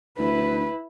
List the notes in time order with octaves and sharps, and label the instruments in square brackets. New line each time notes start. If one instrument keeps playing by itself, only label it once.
[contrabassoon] D2 [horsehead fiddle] E4 B4